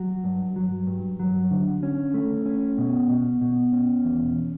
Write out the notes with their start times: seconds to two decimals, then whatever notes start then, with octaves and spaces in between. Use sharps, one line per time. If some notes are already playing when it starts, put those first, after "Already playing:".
Already playing: F#3 F#4
0.24 G2
0.56 F#3
0.87 G2
1.20 F#3
1.51 D3
1.83 C#4
2.14 A3
2.46 C#4
2.78 B2
3.09 B2
3.41 B2
3.73 C#4
4.05 E2